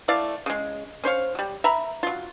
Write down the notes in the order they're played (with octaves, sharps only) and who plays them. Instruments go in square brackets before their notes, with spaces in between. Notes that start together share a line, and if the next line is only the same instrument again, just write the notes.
[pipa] A3 E4 D5 F5
C#3 G#3
C#4 C5 C#5 F5
F#3 G3
E5 A#5 B5
F#3 F4